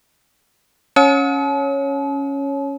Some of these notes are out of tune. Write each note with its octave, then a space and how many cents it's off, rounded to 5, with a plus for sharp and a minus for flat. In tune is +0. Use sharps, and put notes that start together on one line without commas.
C#4 +0 C#5 -5 A5 -45